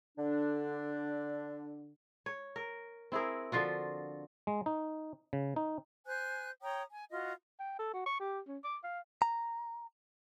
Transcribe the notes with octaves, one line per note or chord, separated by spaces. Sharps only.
D3 D4
C#5
A#4
C4 E4 G#4 A#4
D3 F3 F4 F#4
G#3
D#4
C#3
D#4
C5 G#5 F#6
C#5 G5 A#5 D#6
G#5
F4 F#4 D#5
G5
A4
F#4
C#6
G4
C#4
D6
F5
A#5